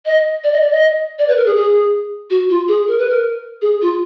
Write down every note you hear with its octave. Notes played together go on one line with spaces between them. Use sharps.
D#5
D5
D#5
D5
D#5
D5
B4
A#4
G#4
G#4
F#4
F4
G#4
A#4
B4
A#4
G#4
F4